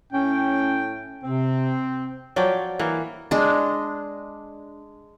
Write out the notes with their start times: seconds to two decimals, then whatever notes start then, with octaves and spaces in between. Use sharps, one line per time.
0.13 A2 C#4 G5
1.24 C3 C4
2.36 F3 F#3 D5 G5
2.79 E3 A#3
3.31 G#3 D4